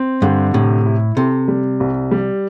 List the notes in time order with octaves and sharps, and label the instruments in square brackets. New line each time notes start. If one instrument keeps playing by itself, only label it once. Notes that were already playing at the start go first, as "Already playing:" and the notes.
Already playing: [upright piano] C4
[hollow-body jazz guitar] G2 [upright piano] D3
[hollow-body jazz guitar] A2 [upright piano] C3
[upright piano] E4
[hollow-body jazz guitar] C3 [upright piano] A4
[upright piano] G3
C2
G3